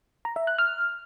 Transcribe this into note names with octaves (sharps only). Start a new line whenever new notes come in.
A#5
E5
F#6
F6